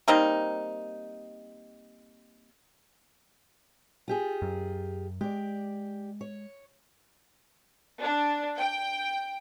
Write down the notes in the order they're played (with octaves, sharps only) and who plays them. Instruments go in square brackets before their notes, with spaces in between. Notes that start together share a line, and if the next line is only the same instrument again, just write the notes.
[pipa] G3 A#3 C4 D#4
[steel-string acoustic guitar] F4 G4 G#4
[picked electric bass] F#2
[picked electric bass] G#3 [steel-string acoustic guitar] G4 D5
[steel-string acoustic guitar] C#5
[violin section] D4
G5